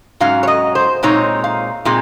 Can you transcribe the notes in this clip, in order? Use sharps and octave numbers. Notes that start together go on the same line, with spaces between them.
G#2 F#3 C#4 F5
C#5
D#5
C5
A#2 G#3 C4 D#4 C#5
F5
A#2 G#3 C4